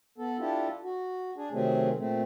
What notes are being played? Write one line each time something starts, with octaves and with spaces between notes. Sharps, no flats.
B3 A4
D4 E4 F4 G4 A4
F#4
D4 G#4
C3 D#3 F#3 A3 C4 G#4
A#2 A3 C4